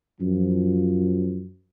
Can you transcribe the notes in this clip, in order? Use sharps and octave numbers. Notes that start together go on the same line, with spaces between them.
F#2 F3